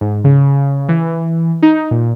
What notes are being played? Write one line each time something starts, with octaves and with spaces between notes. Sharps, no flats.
G#2
C#3
E3
D#4
A#2